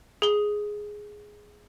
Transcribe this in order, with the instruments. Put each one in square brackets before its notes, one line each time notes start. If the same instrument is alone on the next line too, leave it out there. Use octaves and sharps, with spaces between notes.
[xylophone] G#4 G7